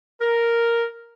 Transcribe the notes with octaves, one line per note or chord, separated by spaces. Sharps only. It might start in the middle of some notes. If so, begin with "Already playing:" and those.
A#4